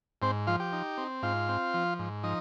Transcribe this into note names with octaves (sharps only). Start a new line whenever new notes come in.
G#2 C4 C5
F3 F4 F5
G4 G5
D#4
C4
G#2 F4 F5
C4
F3
G#2
F3 D#4 D#5